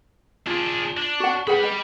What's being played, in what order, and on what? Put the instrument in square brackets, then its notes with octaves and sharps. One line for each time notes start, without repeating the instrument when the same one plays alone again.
[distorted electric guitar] D4 G#4 [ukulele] F4
[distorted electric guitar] D4
[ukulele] F#4 F#5
[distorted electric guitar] G4 B5 [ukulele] G#4 B4 F#5
[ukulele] D#5